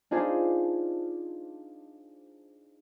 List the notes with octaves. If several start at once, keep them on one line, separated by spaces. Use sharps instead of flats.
D4 D#4 F4 G#4 C5